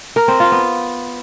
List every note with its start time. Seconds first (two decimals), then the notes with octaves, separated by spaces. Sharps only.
0.16 A#4
0.28 C4
0.40 F4
0.52 B3